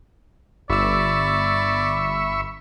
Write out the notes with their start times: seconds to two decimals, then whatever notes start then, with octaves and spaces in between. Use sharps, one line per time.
0.70 G1 D5 E5 B5 C#6 E6